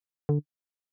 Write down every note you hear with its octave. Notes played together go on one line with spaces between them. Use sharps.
D3